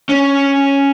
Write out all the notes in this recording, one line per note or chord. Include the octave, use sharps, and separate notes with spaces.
C#4